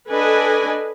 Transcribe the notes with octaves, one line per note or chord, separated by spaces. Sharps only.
D4 A4 B4 D#5 G#5